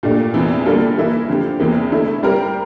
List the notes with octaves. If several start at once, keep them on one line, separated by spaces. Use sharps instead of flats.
A#2 A3 D4 G4
E2 C3 E3
D3 G3 A#3 F4 A4
E3 A#3 E4
D3 F3 C4 G4
E2 C3 E3 A#3
D3 A3 E4
G3 C4 G4 A#4